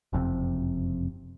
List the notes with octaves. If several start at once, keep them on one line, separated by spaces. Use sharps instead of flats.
F#1 F2 C3